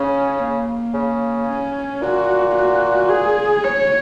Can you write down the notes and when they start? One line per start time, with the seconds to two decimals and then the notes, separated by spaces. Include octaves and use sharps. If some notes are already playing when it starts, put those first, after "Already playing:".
Already playing: C#3 C#4
0.39 A#3
0.94 C#3
1.48 C#4
2.01 A#2 F#4
2.56 F#4
3.10 G#4
3.64 C#5